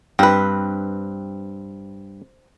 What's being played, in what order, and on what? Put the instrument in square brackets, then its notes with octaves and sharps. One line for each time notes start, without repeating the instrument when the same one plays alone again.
[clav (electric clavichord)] G2 [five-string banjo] C4 B4